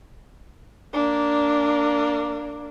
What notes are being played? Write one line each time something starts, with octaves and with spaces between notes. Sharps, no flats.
A#3 D4